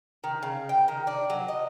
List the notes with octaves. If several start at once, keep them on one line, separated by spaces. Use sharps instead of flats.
D#3
C#3
G5
D#3
D4
F#3
D#5